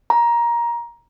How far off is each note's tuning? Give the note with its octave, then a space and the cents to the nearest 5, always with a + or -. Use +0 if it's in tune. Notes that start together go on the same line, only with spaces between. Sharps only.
A#5 +15